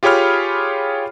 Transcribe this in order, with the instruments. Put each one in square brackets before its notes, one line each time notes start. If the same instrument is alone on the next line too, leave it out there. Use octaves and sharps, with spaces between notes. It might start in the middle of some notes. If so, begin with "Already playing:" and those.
[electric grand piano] F4 G4 G#4 C#5 B5 F6